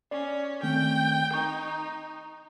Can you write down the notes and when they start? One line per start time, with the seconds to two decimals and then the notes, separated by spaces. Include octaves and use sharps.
0.11 C#4 D5
0.63 D#3 A3 C4 G5
1.33 D#4 C#6